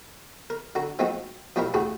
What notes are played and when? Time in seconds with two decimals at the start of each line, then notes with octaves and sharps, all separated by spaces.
0.50 A#4
0.75 D3 F#4 A#5
0.99 F3 G#3 B3 C4 D#4 F#4
1.56 B2 F3 G3 D4 E4 A#4
1.74 E2 A2 C#3 F#4 G4